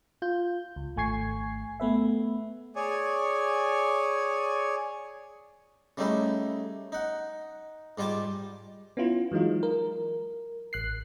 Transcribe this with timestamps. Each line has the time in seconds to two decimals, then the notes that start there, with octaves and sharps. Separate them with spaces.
0.22 F4 G6
0.76 C#2
0.96 G#1 A3 G#5 C#6 G#6 C7
1.80 A3 B3 B4 E5
2.76 G#4 C#5 D5 G#5
5.97 C#3 G3 A3 D#4 E4 F5
6.92 D#4 F#5
7.98 G#2 G3 F4 G#5 A5 D6
8.97 B3 C#4 E4 F4
9.32 E3 F#3 G#3 D#4 F4
9.63 A#4
10.73 A1 F#6 C7